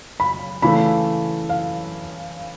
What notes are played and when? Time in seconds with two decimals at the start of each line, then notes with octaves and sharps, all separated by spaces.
0.20 B5
0.62 C#3 E3 A3 B5
1.49 F5